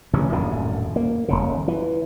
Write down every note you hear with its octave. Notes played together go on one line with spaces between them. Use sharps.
A1 G2 C#3
D#1 F#2 A2 D3
A#3
D#1 G#1 C#3
E3